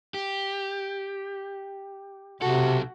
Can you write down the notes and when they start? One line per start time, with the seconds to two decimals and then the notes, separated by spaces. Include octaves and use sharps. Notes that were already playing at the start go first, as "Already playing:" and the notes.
0.14 G4
2.42 B1 C3 F#4 A4